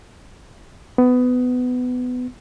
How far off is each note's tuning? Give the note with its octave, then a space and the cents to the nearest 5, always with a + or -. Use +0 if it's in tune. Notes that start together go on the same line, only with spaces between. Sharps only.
B3 +20